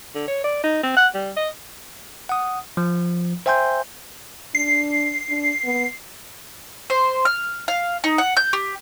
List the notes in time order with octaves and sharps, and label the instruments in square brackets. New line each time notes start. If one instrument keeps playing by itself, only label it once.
[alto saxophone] D3
C#5
D5
D#4
C4
F#5
G3
D#5
[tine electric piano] F#5 D#6
F3
C5 E5 G5 G#5 C6 G6
[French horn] D4 [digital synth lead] C7
[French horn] D4
B3
[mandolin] C5
F6
F5
D#4
F#5
G6
G4